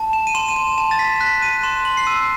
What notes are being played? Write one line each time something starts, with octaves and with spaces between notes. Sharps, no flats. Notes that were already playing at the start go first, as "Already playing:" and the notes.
Already playing: A5
E7
D#7
C6 E7
D#7
E7
A5 E7
A6
B6
F#6 B6
D#7
C6 E7
F#7
C7
E6 D#7